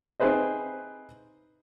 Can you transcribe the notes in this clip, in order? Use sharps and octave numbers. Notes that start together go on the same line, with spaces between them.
C4 D#4 G#4 B4 C5 D#5